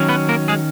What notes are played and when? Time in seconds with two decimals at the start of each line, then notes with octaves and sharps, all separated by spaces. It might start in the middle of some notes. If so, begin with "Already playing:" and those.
Already playing: D#3 F#3 C#4
0.09 B3 B4
0.29 A#3 A#4
0.48 G#3 G#4